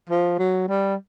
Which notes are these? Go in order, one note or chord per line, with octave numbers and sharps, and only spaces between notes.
F3
F#3
G3